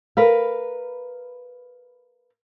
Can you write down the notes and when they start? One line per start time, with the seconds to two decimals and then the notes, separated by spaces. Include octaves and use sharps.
0.17 A#4 B4 F5